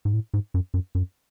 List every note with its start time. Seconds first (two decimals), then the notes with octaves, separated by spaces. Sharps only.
0.05 G#2
0.14 A2
0.34 G#2
0.54 F#2
0.74 F#2
0.95 F#2